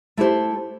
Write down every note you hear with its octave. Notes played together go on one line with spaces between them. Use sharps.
A3 E4 G4 C5